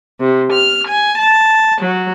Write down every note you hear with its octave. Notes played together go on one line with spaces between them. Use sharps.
C3
F6
G#5
A5
F#3